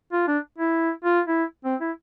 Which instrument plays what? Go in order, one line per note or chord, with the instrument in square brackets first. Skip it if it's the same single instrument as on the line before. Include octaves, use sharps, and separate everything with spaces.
[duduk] F4
D4
E4
F4
E4
C4
E4